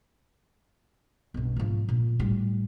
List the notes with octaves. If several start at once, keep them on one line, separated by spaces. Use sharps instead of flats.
B1 G2
G#2 F3
A#2
A2 G3